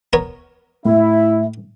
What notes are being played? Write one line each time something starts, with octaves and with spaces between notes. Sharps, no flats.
B3 A#4 C#5
A2 E4 E5